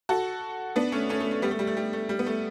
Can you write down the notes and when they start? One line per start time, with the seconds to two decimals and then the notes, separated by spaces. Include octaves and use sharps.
0.09 F#4 A4
0.76 B3 D4
0.92 A3 C#4
1.09 A3 C#4
1.20 A3
1.31 A3
1.42 G3 B3
1.51 A3
1.59 G3
1.67 A3
1.77 G3
1.93 A3
2.09 G3
2.19 B3
2.26 A3